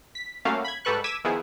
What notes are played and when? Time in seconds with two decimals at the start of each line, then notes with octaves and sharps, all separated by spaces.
0.15 B6
0.45 G3 A3 A#3 C#4 F#4 F5
0.64 B5 G#6
0.85 G#2 G3 A4 B4 C#6 F#6
1.04 D6 E6 G#6 B6 D#7 E7
1.24 D#3 F3 B3 E4 G#4